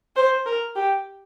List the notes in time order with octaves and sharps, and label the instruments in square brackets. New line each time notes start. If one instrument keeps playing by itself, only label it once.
[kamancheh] C5
A#4
G4